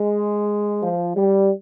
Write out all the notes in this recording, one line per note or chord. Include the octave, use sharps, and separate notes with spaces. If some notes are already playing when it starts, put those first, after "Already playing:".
Already playing: G#3
F3
G3